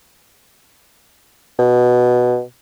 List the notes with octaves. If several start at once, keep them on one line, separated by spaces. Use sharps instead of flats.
B2